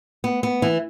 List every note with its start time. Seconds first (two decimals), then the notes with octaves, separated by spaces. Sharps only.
0.24 B3
0.43 B3
0.62 E3